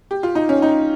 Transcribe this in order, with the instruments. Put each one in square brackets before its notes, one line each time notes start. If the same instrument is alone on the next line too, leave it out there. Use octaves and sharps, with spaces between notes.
[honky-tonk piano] G4
F4
D#4
C#4
D#4